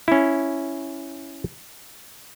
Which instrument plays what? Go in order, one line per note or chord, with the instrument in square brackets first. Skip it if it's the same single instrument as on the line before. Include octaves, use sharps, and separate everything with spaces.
[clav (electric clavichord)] C#4 E4